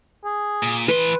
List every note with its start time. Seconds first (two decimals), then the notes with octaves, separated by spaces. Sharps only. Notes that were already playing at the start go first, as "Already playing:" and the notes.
0.24 G#4
0.63 A#2
0.88 E3 B4 C6